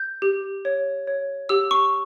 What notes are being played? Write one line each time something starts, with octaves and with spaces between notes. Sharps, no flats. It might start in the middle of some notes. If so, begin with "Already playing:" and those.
Already playing: G6
G4
C#5
C#5
G4 E6
C#6